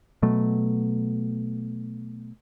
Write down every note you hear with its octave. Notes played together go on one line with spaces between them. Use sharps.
B2 F#3 A3